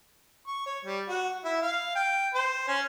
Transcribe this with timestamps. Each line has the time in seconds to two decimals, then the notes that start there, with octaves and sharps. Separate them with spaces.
0.47 C#6
0.66 C#5
0.85 G3
1.08 F#4
1.44 E4
1.62 F5
1.95 G5
2.34 C5
2.68 C#4